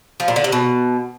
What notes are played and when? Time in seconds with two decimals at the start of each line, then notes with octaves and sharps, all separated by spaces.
0.20 F3
0.28 A#2
0.36 D3
0.44 C3
0.52 B2